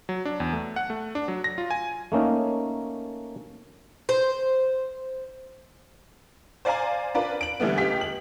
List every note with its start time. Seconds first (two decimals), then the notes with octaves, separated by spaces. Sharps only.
0.09 F#3
0.25 D4
0.40 E2
0.53 A3
0.76 F#5
0.90 A3
1.15 D4
1.28 F#3
1.44 A#6
1.58 F4
1.71 G#5
2.12 A3 A#3 C#4 D#4
4.09 C5
6.65 C5 D5 F5 G#5 A#5
7.15 D4 F4 A#4 B4 D5
7.41 D7 F#7
7.60 D3 E3 G3 A3 B3
7.77 C#2 G4 G5 B6
8.01 F#7